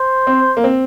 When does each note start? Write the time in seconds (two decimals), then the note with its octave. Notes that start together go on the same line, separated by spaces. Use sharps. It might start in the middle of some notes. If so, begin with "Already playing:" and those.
Already playing: C5
0.27 C4
0.57 A#3
0.64 C4